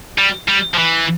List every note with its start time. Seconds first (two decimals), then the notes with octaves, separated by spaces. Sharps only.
0.18 G3
0.48 G3
0.75 F3
0.78 E3